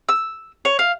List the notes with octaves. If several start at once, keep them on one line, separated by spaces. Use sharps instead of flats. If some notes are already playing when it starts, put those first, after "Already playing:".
E6
C#5
F5